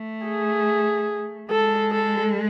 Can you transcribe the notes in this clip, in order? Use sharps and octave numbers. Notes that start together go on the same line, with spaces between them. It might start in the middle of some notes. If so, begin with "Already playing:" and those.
Already playing: A3
G#4
G#3 A4
A4